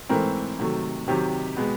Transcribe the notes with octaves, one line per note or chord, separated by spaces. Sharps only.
G#2 E3 A3 C4 A#4
C3 D#3 F#3 A3
C3 D#3 F#3 G4
B2 G#3 B3